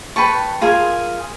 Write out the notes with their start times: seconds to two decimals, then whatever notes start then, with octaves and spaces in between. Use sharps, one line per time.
0.16 B4 G5 A5 C#6
0.61 F4 G#4 A#4 G#5